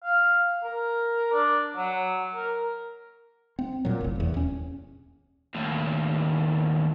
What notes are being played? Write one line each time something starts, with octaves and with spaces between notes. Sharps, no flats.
F5
A#4
D4
F#3
A#4
C4
A#2 F#3
F1 C2
F1 E2
D#1 C#4
D#2 A2